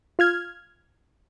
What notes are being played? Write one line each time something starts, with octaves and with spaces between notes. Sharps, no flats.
F4 F6 G#6